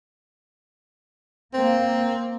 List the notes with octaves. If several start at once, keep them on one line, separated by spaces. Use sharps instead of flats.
A#3 C4